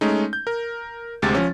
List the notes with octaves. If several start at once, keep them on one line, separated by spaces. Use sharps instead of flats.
G#3 A3 C#4 D#4
G6
A#4
D2 C3 G#3 G4 A6
F3 C#4